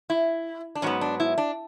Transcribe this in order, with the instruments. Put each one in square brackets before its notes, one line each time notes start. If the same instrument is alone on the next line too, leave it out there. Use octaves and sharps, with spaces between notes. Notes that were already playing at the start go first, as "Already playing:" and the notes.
[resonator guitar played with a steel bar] E4
D4
G#2 F#3 B3 C#4
D4
E4
D4